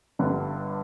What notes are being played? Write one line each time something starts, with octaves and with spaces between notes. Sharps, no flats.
G1 G2 D3 G3 D4